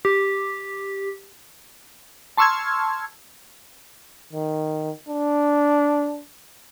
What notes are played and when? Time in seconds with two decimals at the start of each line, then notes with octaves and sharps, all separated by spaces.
0.05 G4
2.37 A5 C6 C#6 E6 F6 G#6
4.33 D#3
5.09 D4